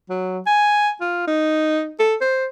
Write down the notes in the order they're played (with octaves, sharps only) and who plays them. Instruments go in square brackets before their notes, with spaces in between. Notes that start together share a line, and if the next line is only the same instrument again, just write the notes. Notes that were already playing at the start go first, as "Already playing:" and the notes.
[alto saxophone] F#3
G#5
F4
D#4
A4
C5